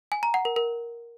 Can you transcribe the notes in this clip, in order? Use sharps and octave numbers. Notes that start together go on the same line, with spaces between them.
G#5
A#5
F#5
A#4
A#4